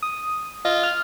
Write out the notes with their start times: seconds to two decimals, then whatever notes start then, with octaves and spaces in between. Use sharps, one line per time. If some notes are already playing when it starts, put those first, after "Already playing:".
0.03 D#6
0.65 F4 D#5
0.84 F6